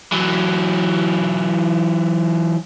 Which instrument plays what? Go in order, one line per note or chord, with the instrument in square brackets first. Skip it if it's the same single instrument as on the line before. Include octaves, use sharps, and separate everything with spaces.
[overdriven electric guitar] E3 F#3